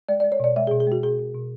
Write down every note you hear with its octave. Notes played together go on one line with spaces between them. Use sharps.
G#3 D5
D5
G#3
C#5
B2 D5
G#3 E5
G#4
B2
G#4
G#3 F#4
B2 G#4
B2
B2